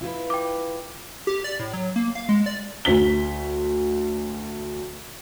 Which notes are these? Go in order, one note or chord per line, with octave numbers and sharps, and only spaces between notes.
E4 F4 B4
G5 D6
G4
D5
A2
F#3
A#3
F5
G#3
D5
D2 B6 G7